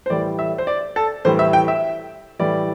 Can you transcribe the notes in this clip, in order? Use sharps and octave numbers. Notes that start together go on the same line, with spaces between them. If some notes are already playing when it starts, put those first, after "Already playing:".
C5
A2 E3 G3 D5
E5
C5
D5
A4
A2 E3 G3 C5
E5
G5
E5
A2 E3 G3 D5